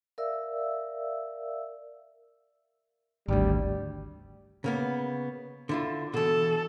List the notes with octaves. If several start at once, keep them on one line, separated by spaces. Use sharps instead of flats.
A#4 D5 E5 F5 E6
G#1 D2 G3
C#3 A#3 B3
D3 E4 F4
B2 E3 A4